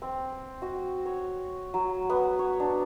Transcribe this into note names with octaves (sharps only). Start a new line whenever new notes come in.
C4
F#4
C#5
F#3
B3
C#5
D4